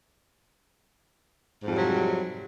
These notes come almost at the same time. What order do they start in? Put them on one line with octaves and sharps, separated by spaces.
G#2 F2 G3 F#3 C3